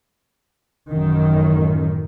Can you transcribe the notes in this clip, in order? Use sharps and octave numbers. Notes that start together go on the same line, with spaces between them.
A1 F#2 D#3